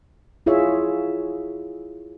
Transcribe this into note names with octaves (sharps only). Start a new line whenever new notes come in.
E4 F4 G#4 C#5 E5